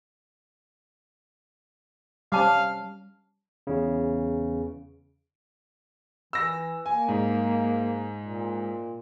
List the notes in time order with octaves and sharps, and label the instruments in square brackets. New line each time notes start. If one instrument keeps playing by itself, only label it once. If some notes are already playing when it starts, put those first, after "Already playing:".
[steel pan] G3 C#4 [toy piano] C5 A5 D6 [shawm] F5
[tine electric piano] E2 C#3
[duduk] E3 [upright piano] E6 A#6
[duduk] A#3 [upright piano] G#5
[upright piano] G#2
[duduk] A#2